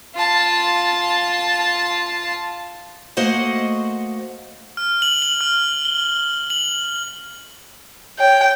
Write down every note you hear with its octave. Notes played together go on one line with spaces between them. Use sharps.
F4 A5
A3 A#3 F#4 C5 D#5 F#5
F6
F#7
F#7
F6
G7
F#7
C#5 G5